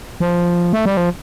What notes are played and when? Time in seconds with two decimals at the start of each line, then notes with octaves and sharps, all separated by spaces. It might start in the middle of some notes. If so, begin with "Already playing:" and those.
0.20 F3
0.73 A3
0.86 G3
0.97 F3